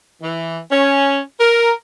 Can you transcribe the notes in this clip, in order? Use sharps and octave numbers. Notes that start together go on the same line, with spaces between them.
E3
C#4
A#4